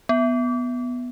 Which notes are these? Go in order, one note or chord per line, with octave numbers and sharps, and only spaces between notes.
B3